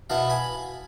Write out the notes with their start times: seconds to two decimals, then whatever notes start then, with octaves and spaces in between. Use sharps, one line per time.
0.10 B2 B3 E4 F5 A5
0.29 G#5 B5